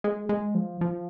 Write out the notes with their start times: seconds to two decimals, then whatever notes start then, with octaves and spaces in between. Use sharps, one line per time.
0.04 G#3
0.29 G#3
0.55 F3
0.81 F3